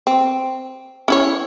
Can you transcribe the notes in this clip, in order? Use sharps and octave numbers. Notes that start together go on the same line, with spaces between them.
C4
C#4 E4 C#5